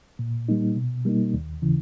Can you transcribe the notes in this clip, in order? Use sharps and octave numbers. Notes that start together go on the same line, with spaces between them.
A#2
G3 A#3 D#4
B2
G3 A#3 D#4
D#2
C#3 E3